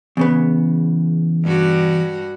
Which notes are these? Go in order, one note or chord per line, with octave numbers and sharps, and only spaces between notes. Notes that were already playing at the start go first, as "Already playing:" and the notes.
E2 C#3 B3
G2 F#4